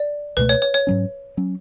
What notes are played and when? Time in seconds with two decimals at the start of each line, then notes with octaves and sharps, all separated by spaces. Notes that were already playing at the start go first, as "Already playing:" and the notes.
Already playing: D5
0.37 C#2 B2 A3 B4
0.49 C#5
0.62 C#5
0.74 C#5
0.87 G#2 F#3 C#4
1.37 F#3 C#4